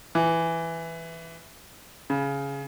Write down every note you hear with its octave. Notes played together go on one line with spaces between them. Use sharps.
E3
C#3